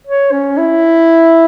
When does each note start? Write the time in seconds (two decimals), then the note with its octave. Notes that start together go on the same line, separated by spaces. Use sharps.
0.07 C#5
0.32 C#4
0.58 E4